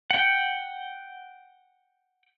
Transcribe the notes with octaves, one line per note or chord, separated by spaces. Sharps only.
F#5 G5